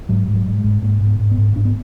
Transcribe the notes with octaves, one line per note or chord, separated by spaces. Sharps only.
G#2 F#3
G#2
F#3
G#2
G#3
G#2
G#2 A#3
G#2
B3
G#2
B3
G#2
G#2 D4
B3